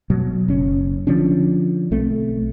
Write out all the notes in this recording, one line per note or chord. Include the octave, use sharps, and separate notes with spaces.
B2 F#3
F#1 C#4
D3 F3 C#4 D4
B1 A3 C4